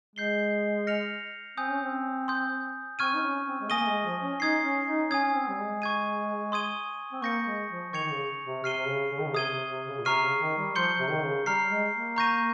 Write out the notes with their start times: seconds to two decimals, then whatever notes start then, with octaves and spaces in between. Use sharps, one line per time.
0.16 G#3 G6 C7 G7
0.87 F6 A#6 C#7 F7
1.57 C4 G#5 D#6 G6
1.70 C#4
1.83 C4
2.28 C6 D#6 G6
2.99 C4 C#6 F6 G#6 D#7
3.15 D#4
3.22 C#4
3.46 C4
3.61 G#3
3.69 A#3 G#5 D#6 A#6 D#7 G7
3.79 A#3
3.88 G#3
4.05 F3
4.22 C#4
4.40 D#4 D#6 G#6 C7
4.64 C#4
4.87 D#4
5.10 C#4 G#5 D#6 G#6
5.25 C#4
5.34 C4
5.49 G3
5.57 G#3
5.82 C#6 G#6 D#7
6.52 C6 D#6 G#6 D#7 G7
7.12 C4
7.22 A#3 C#6 G6 A#6 C#7
7.45 G#3
7.70 F3
7.93 D#3 C#6 G#6 C#7 F7
8.04 D#3
8.11 C#3
8.46 C3
8.64 C3 F6 C7 D#7 G7
8.77 C3
8.88 C#3
9.11 C#3
9.19 D#3
9.26 C#3
9.34 C3 D#6 G#6 D#7 G7
9.53 C3
9.70 C3
9.88 C#3
10.00 A#2
10.05 C3 A#5 C#6 F6 C7 D#7
10.22 C#3
10.41 D#3
10.58 G3
10.75 F3 C6 G6 C#7 G7
10.99 C3
11.10 D#3
11.23 C#3
11.46 G3 A#5 F6 C7
11.69 G#3
11.94 A#3
12.16 A#5 C#6 G6 A#6 D#7